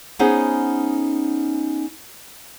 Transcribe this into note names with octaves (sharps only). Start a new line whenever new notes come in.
B3 C#4 D#4 G#4 C5